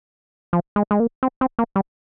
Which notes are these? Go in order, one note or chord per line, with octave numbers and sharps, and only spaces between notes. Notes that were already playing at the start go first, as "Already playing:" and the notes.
F3
G#3
G#3
A#3
C4
C4
A#3
G3